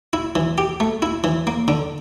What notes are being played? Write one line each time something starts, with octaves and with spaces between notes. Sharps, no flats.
E4
E3
G4
A3
E4
E3
A#3
D3